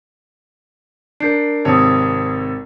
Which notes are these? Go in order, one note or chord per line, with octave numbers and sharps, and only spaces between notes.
D4 A#4 G6 C7 D7
G#1 C3 C#5 A5 D#6